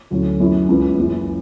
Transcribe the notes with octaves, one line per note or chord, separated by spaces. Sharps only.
D2 D3 F#3 C#4 E4
F#2 E3 A3 E4
C#2 C#3 E3 B3
F#1 F#2 E3